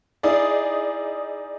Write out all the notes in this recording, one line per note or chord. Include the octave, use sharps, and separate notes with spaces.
D#4 E4 G#4 D5